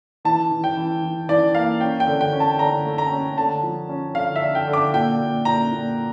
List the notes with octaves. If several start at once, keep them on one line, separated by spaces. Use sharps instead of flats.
E3 A5
E3
G5
E3
E3
E3 D5
A#3 F5
C#4 G5
G5
D3
G5
C#4
A5
D3 A#5
A3
A#5
C#4
D3 A5
F3
C#4
D3 F5
E5
D3
G5
D3
D6
A#2 G5
A#2
A#2 A#5
A#2